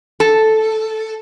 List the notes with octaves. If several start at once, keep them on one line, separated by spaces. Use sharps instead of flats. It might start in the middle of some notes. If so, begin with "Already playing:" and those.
A4